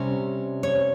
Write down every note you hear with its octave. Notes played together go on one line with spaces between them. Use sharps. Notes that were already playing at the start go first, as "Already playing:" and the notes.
Already playing: C3 G3 C#4
C#5